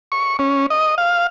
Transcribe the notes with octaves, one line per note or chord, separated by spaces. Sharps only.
C#6
C#4
D#5
F5